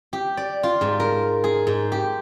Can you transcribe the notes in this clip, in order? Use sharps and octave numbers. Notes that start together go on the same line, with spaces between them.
G4
D5
F4
G#2
A#4
G#4
G#2
G4